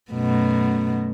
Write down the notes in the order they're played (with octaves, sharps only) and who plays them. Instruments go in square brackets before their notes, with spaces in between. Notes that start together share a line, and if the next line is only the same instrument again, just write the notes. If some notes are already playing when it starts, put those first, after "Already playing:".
[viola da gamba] F#2 B2 A3